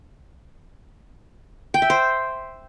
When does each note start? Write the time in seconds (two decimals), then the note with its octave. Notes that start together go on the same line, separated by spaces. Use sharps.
1.74 G5
1.82 E5
1.90 C5